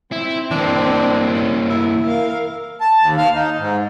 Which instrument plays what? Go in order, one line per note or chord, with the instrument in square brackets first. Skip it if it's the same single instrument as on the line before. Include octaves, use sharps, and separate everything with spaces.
[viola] C4 [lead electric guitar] E4
[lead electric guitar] E3 A#3 [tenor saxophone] D4
[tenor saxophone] C#4
E4
[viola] A#4 F5
[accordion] A5
D#2
F5
D#4
G#2